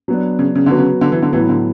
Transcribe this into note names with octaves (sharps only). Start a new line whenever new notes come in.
F#3 B3 D4
C#3
C#3
D3 F#3 B3 F#4 B4
C#3
D3
E3
D3
A2 E3 F#3 B3 E4
D3